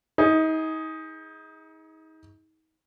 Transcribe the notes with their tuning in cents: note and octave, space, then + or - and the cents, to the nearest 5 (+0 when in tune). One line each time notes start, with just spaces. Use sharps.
D#4 +35 G#4 +0